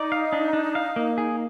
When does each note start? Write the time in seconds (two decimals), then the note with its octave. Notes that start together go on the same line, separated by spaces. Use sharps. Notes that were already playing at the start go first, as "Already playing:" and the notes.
Already playing: D#4 D5
0.12 F5
0.33 D4
0.53 D4
0.75 F5
0.96 A#3
1.18 G#4